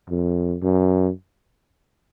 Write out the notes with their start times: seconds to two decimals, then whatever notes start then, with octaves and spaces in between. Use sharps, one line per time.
0.10 F2
0.62 F#2